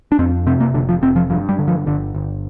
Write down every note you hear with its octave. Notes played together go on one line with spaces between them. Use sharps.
D4
F2 C4
C3 C4
A#3
F1 D3
F3
F1 C4
F3
G2 F3
G3
D3
F3
G1 D3
G1